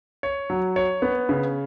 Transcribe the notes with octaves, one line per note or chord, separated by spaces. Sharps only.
C#5
F#3
C#5
B3
C#3